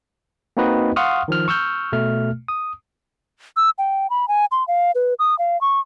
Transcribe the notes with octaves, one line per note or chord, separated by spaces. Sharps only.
A#3 C4 D#4 F#4 B4 D#5
F5 F#5 C6 C#6 D#6 F6
D#3 F3 F6
C#6 E6 F6 G6
B2 A3 F6
D#6
E6
G5
B5
G#5
C6
F5
B4
D#6
F5
C#6